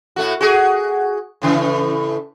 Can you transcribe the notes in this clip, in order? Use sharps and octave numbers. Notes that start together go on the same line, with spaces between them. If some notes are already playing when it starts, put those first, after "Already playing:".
A2 A3 F#4
F#4 G#4
A2 C#3 E3